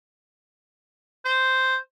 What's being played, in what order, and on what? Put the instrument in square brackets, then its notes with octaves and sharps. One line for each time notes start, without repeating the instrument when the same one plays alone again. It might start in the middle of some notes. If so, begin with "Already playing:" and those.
[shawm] C5